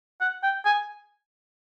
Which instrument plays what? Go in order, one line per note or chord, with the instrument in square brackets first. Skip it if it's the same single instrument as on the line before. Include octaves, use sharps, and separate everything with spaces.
[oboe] F#5
G5
G#5